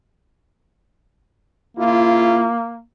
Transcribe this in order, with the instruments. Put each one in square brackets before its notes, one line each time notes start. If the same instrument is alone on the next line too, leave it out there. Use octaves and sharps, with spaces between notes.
[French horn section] C#3 E4 F4 [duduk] A#3